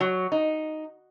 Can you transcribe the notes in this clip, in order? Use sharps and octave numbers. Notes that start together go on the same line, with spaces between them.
F#3
D#4